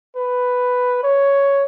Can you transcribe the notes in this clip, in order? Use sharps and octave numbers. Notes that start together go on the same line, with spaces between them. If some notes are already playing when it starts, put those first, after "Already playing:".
B4
C#5